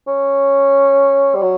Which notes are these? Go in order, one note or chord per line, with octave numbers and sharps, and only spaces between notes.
C#4
G3
F#3